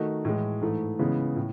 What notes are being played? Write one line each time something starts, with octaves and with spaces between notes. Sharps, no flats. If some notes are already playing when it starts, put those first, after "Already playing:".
Already playing: D#3 A3 D#4 F#4
A2 E3 G#3
G#2 E3 A3
C#3 E3 G#3 B3
A2